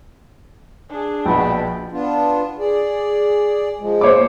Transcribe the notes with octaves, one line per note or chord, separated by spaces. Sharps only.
D4 G#4
A#1 B2 F#5 G5 A5 B5
B3 D4 F4
G#4 D5
F3 G#3
C5 C#5 D6